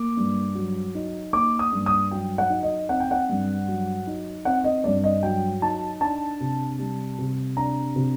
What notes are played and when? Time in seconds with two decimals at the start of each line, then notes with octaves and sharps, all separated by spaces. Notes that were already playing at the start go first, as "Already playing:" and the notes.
Already playing: A#3 D6
0.17 G2
0.55 F#3
0.95 D#4
1.33 A#3 D6
1.59 D#6
1.73 G2
1.86 D#6
2.11 F#3 G5
2.38 F#5
2.50 D#4
2.63 D#5
2.89 C4 F#5
3.00 G5
3.11 F#5
3.29 G2
3.68 F#3
4.07 D#4
4.45 C4 F#5
4.64 D#5
4.84 G2 D5
5.04 D#5
5.23 F#3 G5
5.62 D#4 A5
6.01 D4 A5
6.40 C3
6.79 G3
7.19 C3
7.57 D4 A#5
7.96 C3